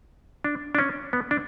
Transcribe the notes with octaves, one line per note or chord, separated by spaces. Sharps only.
D4
D4
C#4
B3
D4